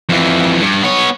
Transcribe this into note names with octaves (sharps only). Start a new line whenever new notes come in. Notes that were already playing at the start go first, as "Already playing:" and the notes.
F2 E3
G2
B3 C#5